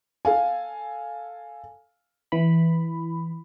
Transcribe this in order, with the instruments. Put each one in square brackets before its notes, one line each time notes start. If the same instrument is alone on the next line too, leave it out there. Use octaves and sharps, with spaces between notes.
[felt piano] A4 F5 G#5
[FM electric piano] E3 B5